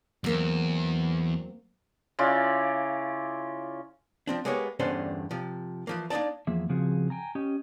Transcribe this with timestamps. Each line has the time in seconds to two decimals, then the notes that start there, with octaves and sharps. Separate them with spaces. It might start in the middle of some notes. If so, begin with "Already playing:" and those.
0.24 E2 F#3 A#3 C4
2.19 C#3 E4 F4 D5
4.27 F3 C4 D4
4.45 G#3 A#3 B3 G4 C#5
4.80 E2 G2 D3 C#4 D4 C5
5.31 C3 F3
5.87 E3 F3 A#3
6.10 A#3 D4 D#4 D5 A5
6.47 E2 F3 A#3 G#4 E5
6.69 C#3 F3 C4 F#4 G#4
7.10 G5 G#5 A#5
7.35 C#4 G4 D#5